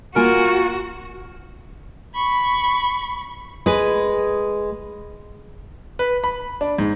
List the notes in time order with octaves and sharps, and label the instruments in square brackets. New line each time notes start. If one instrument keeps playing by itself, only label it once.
[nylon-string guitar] A#3 F4 G#5 [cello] F#4 [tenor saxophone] A#4
[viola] B5 C#6
[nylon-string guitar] G#3 B4
[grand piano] B4
B5
D4
G#2